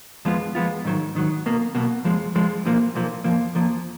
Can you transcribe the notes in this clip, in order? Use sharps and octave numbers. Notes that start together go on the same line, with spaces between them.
F2 F3 G#3 B3 F4
F2 F3 G#3 B3 F4
G#2 D#3 F#3
G#2 D#3 F#3
B1 B2 A#3
B1 B2 A#3
F2 F3 G#3
F2 F3 G#3
B1 A#2 F3 A#3
B1 A#2 F3 A#3
F2 F3 A#3
F2 F3 A#3